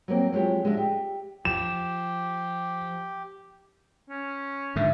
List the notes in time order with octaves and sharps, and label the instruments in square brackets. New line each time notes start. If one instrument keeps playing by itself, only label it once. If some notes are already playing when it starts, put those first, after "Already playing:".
[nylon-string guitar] F#3 G3 A#3 C4
F3 F#3 G#3 G4 C#5
G#3 D4 F#4 D#5 E5
G4
[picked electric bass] F3 [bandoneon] G4 [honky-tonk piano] E7
[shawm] C#4
[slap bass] G#2 D3 [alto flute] E5